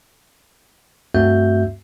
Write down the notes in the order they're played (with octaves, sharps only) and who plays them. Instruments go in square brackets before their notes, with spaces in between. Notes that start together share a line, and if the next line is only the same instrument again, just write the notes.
[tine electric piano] G2 A3 C4 F#4 E5 G6